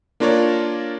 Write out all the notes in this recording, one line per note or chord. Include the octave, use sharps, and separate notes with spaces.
A#3 D4 F4 A#4 C#5 D5